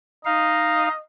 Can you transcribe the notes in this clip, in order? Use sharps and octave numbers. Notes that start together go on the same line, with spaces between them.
D#4 D#5 F5